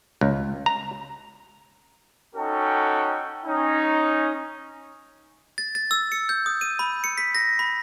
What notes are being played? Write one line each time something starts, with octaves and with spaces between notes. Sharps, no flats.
C#2
A#5
C#4 D#4 F#4 A4 G5
C#4 D#4
A6
A6
E6
C#7
G6
D#6
D#7
B5
C#7
B6
A#6
B5